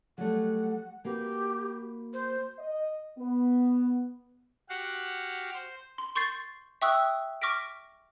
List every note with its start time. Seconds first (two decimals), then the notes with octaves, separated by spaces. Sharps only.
0.18 F#3 G3 A3 F#5
1.05 A#3 F#4 G4 B4
2.13 C5
2.59 D#5
3.19 B3
4.69 F#4 G4 F5 F#5
5.54 C5
5.98 C6
6.15 C6 C#6 G6 A6 C7
6.82 E5 G5 C#6 D#6 E6 F#6
7.41 C#6 D6 F6 A#6 B6 D7